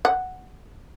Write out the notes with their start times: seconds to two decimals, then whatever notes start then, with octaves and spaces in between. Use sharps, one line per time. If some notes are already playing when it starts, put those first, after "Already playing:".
0.05 F#5